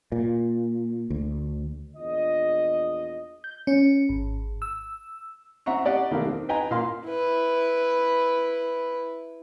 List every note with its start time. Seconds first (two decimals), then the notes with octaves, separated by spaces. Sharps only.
0.12 A#2
1.10 D2
1.96 A#1 E2 D4 F4 D#5
3.44 G6
3.67 C#4
4.09 G#1
4.62 E6
5.66 C4 E5 F#5 A#5 C#6
5.85 G4 D5 D#5 F#5
6.11 B1 D#3 A3 G4 A#4 F5
6.26 D#3 C4
6.49 B4 D#5 G5 G#5 A#5
6.71 A#2 A#3 F5 C6
7.06 E4 B4